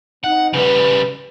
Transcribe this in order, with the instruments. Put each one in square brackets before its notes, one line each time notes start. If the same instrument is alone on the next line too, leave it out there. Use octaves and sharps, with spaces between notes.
[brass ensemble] C4 D#4 [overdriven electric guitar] F#5
[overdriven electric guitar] C#3 G3 [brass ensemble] B4